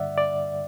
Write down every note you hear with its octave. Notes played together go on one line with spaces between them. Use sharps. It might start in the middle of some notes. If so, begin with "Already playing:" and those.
Already playing: G2 D3 G3 D5 E5 F#5
D5